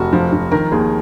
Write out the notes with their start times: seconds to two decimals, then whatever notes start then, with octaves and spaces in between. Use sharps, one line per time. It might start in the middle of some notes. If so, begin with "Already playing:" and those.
Already playing: F1 F#4
0.13 F3
0.33 F3
0.51 D#3 A#4
0.72 D#2 G#4